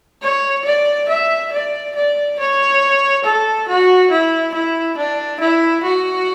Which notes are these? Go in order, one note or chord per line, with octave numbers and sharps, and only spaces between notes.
C#5
D5
E5
D5
D5
C#5
A4
F#4
E4
E4
D4
E4
F#4